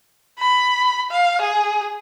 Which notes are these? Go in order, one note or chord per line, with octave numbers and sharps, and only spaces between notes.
B5
F5
G#4